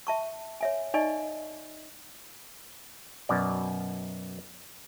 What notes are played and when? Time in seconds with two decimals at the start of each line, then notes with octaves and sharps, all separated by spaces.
0.07 E5 A5 C#6
0.61 C#5 E5 G#5
0.94 D#4 D5 D#5 G#5 C#6
3.29 F#2 B2 D5